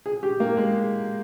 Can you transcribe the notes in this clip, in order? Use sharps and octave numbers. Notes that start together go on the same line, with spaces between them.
G#4
G4
A#3
G#3